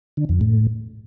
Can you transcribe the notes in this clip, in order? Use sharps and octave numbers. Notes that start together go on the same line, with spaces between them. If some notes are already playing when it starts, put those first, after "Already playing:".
D3
F2
A2